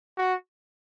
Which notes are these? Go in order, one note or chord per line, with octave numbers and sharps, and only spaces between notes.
F#4